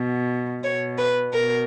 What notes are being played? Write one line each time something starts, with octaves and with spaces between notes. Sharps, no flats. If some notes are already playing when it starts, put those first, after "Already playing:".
Already playing: B2
B2 C#5
B4
B2 A#4